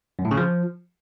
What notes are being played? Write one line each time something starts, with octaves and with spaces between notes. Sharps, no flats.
F#2
A2
C#3
F3